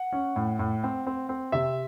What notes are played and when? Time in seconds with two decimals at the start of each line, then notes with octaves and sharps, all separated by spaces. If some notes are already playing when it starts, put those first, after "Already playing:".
Already playing: F#5
0.13 C#4
0.36 A2
0.59 A2
0.84 C4
1.07 C4
1.29 C4
1.52 C3 E5